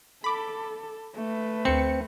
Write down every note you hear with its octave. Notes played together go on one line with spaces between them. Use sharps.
A4 B5 D6
A3 B4
D2 C4 C#7